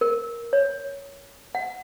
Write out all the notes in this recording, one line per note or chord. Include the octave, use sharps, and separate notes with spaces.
A#4
C#5
F#5